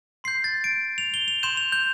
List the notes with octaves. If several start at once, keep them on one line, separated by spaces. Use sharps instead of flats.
C6 G6 C7
A6
D7
F7
G7
F7
C6 G6 E7
F7
G6